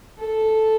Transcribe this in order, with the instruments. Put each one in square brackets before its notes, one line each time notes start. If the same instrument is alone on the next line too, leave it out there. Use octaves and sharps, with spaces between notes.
[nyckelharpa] A4